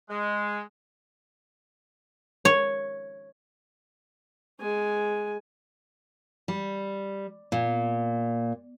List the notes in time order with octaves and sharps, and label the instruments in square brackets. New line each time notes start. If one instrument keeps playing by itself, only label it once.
[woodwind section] G#3
[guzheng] C#5
[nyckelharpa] G#3 G#5
[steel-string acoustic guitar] G3
A#2